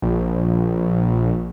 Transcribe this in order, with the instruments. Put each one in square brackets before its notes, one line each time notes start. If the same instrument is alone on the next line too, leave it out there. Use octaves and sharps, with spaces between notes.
[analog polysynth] A#1